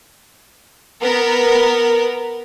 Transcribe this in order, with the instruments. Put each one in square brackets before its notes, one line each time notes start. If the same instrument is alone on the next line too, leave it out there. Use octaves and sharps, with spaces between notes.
[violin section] B3 A#4